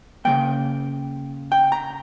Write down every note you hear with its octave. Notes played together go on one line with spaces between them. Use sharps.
C#3 F3 A#3 G5
G5
A#5